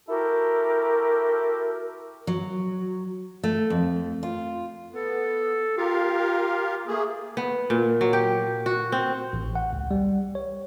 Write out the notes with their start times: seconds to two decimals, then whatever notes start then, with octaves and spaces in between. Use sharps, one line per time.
0.08 E4 F#4 G4 A4 A#4
2.27 F#3
3.43 A3
3.70 F2
4.23 F4
4.93 B3 A4
5.77 F4 G4 A#4 F5
6.87 A3 A#3 G#4
7.37 B3
7.70 A#2
8.01 F#3
8.13 G4
8.66 F#4
8.92 C4
9.33 A1
9.55 F#5
9.73 C#2
9.91 G3
10.35 C#5